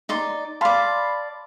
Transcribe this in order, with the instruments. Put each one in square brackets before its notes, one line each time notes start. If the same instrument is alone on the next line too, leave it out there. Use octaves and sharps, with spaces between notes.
[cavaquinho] D#4 D5 C6
[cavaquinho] D5 F5 [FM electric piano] A5 B5 C6